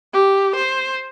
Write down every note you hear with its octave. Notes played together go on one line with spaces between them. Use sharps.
G4
C5